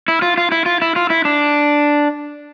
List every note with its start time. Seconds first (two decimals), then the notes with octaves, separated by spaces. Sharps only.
0.08 E4
0.22 F4
0.38 F4
0.52 E4
0.66 F4
0.82 E4
0.96 F4
1.10 E4
1.25 D4